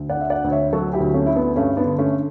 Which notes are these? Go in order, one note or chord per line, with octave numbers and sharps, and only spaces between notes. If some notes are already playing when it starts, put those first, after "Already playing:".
Already playing: D2
D5 F#5
D3 E5
D5 F#5
D2
C#5 E5
F#3 F#4 A4
E4 G4
D2
A3 C#4
D3 E4
B3 D4
G2 A3 C#4
B3 D4
D3
A3 C#4